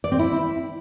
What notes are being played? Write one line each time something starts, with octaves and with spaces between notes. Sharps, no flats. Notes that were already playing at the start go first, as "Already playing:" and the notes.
D5
C4
E4